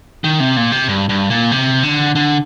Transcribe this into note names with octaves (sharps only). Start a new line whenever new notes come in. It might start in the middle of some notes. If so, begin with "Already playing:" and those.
D#3
C3
A#2
C3
G2
G2
A#2
C3
D3
D3